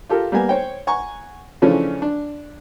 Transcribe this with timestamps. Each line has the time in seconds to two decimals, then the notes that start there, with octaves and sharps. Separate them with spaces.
0.09 F4 G4 A4 A#4
0.32 G3 A#3 B3 G#5
0.49 C5 C#5 G5
0.87 F#5 G#5 A#5 C#6
1.62 C#3 E3 F3 A3 C#4 D4
2.02 D4